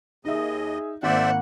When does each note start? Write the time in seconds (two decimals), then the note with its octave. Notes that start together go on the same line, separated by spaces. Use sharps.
0.25 D#2 D#4 G#4 D#5 E5
1.03 G#1 A#3 C5 D5 E5 F#5